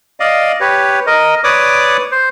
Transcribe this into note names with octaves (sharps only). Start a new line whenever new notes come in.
D5 D#5 F5
G4 B4 C#5
A#4 D#5
B4 C#5 D5 D6 D#6
C5